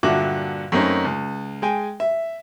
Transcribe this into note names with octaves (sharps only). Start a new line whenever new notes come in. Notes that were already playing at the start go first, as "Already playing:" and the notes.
G2 A#2 D3 F#4 E5 D6
F#2 A3 A#3 C4 C#4 D#4
C#2
G#3 G5 G#5
E5